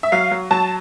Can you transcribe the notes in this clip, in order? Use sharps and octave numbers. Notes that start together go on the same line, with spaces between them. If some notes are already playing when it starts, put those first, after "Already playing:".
E5
F#3 F5
F#3
F#3 A5